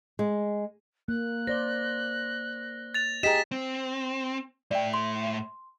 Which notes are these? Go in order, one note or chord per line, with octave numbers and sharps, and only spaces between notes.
G#3
A#3 F#6
C5 D5 A#6 G7
A6 F7
G4 G#4 D#5 G5 A#5 B6 E7
C4
A2 D5 E5 G5
C6